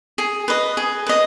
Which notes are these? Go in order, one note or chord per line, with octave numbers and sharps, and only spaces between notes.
G#4
B4 D#5
G#4
B4 D#5